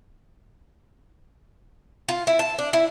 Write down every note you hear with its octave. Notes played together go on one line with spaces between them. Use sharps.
F4
E4
A5
D4
E4